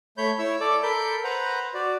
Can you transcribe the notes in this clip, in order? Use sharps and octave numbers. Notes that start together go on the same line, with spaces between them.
A3 C#5 B5 G6
E4 C#5 E6
A4 D5 D6
A4 A#4 B5 G6
B4 C5 F#5 A#5
F#4 D5